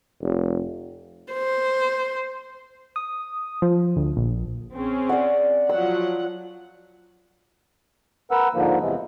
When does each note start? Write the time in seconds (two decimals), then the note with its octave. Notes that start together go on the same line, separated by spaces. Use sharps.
0.22 F1
1.33 C5
2.96 D#6
3.62 F3
3.96 D2
4.17 A#1
4.74 C4 C#4 G#4
5.09 D5 F#5
5.69 F3 F#3 F#5 E6
8.31 A#4 B4 F#5 E6
8.54 G#2 D3 F3 A#3
8.80 E2 C3 E3 G#3